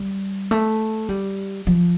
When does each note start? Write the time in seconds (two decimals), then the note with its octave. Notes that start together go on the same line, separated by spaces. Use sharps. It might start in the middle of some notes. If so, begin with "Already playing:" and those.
Already playing: G3
0.51 A3
1.09 G3
1.67 F3